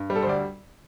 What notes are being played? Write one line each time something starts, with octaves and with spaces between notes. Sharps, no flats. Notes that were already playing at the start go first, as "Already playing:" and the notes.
Already playing: G2
G3
A4
C5
D2 D5